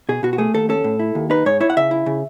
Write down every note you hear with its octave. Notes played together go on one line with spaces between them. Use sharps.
B2 G#4
B2 F#4
F#4
A3 G#4
D#2 A4
C#4 A4
A2
E4
D#2
D#4 B4
G#2 C#5
E4 C#5
F#5
C#3 E5
E4
C#3